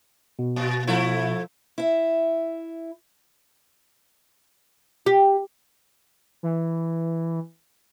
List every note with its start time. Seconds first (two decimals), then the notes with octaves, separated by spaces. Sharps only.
0.39 B2
0.56 A#2
0.87 F3 A3 E4
1.78 E4 E5
5.06 G4
6.43 E3